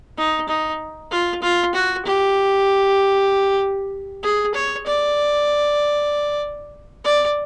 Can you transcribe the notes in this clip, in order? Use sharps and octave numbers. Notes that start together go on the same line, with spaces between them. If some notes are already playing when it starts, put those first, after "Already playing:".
D#4
D#4
F4
F4
F#4
G4
G#4
C#5
D5
D5